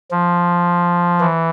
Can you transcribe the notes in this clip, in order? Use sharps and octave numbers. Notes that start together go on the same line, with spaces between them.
F3
E3